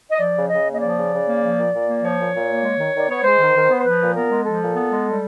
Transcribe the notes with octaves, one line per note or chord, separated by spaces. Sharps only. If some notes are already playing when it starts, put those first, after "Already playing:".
D#5
F3 D5
C#3
C#3 D#5
A#3
D#5
F3 D5
C#3
C#3
A#3
F3
A#2
A#2
A#3
F3 C#5
A#2
A#2
A#3
G#3
D#3
D#3 D5
B3 C#5
G#3 C5
D#3
D#3
B3
C5
F3 B4
A#2
B3 A#4
G#3
F3 A4
A#2
B3
G#3
G3